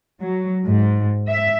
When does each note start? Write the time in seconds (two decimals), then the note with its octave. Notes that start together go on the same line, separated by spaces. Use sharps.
0.21 F#3
0.65 G#2
1.28 E5